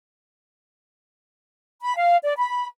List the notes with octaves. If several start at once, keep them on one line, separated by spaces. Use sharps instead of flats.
B5
F5
D5
B5